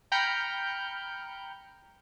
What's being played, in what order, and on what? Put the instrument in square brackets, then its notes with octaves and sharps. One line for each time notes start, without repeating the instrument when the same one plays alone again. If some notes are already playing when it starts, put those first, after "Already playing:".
[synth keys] G5 A#5 B5 F6 G6 C#7